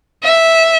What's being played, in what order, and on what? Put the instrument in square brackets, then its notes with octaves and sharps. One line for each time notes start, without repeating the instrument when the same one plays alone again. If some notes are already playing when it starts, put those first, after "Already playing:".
[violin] E5